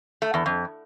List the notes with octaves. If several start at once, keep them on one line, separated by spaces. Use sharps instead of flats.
A3
E2
F2